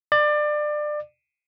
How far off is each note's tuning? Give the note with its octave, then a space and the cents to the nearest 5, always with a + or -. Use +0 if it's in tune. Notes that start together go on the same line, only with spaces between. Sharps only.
D5 +25